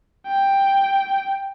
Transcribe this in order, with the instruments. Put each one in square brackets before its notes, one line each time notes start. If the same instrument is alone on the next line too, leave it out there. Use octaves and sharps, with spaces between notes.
[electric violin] G5